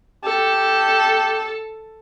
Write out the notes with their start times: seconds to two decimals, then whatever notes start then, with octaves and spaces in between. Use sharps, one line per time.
0.24 G4 A4